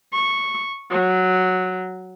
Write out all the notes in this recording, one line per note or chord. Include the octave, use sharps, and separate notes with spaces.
C#6
F#3